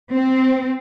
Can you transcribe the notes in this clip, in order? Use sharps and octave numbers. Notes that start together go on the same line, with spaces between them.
C4